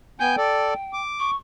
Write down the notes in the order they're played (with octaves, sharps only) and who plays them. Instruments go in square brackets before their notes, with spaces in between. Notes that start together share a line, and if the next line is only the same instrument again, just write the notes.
[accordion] B3 G#5 G6 [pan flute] G5
[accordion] A4 D5
D6
[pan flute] C#6